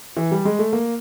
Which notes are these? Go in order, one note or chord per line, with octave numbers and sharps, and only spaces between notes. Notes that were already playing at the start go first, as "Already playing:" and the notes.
E3
G3
G#3
A3
A#3